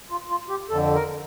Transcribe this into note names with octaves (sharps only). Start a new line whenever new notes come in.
F4
F4
G4
F2 D3 A4
A#4